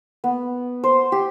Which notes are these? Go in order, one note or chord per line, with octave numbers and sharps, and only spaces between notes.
B3
C5
G4